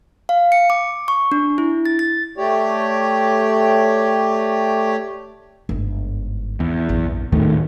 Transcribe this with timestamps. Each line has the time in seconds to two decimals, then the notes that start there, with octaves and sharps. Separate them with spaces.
0.29 F5
0.52 C#7
0.70 D6
1.08 C#6
1.32 D4
1.58 E4
1.86 A6
1.99 A6
2.38 A3 G4 C#5 D5
5.69 G1 G#2
6.60 E2
6.89 A#1 F#2
7.32 D#1 A2 D#3 A3